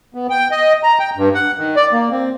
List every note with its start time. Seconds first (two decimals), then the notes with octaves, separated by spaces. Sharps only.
0.14 B3
0.30 G5
0.51 D#5
0.83 A#5
1.00 G5
1.17 G2
1.35 F#5
1.58 D#3
1.76 D5
1.92 A#3
2.11 C4